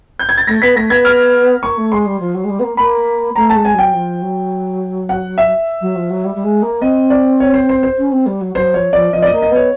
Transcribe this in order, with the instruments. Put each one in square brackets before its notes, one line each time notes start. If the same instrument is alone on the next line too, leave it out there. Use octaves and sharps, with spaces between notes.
[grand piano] G6
G#6
A6
[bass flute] A3 [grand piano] A#6
[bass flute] B3 [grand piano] B6
[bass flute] A3 [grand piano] A#6
[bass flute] B3 [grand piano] G#6
[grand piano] F6
[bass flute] A#3 [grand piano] C#6
[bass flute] A3
[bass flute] G#3 [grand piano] C6
[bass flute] G3
F3
F#3
G#3
G3
B3
A#3
[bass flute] A#3 [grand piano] B5
[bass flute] A3 [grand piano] A#5
[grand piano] A5
[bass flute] G#3
[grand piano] G#5
[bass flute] F#3 [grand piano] G5
[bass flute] F3
F#3
[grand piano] F#5
E5
[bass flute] F#3
F3
F#3
G3
G3
G#3
A#3
[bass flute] C4 [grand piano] D#5
[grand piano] D5
C#5
C5
C5
C5
[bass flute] C#4
C4
G3
F#3
[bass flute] F#3 [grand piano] C5
[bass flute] F3 [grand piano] C#5
[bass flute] F3 [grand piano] D5
[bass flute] F3 [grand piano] D#5
[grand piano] D5
D#5
[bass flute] A#3
[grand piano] D#5
[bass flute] B3 [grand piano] C#5